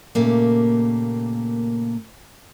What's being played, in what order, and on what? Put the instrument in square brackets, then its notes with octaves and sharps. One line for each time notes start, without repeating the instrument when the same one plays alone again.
[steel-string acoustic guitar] A#2 C#3 A3 A#3 G4